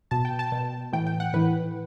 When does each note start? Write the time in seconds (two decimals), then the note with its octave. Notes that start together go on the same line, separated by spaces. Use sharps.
0.11 B2 A5
0.25 G5
0.39 A5
0.52 B2
0.93 A2 E3 G5
1.07 G5
1.20 F#5
1.33 A2 E3 B4